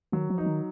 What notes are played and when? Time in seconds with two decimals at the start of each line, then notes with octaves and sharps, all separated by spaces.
0.12 D#3 F#3
0.30 F3
0.38 D#4
0.46 D#3